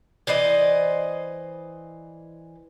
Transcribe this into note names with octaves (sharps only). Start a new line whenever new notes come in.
E3 C5 D5 D#5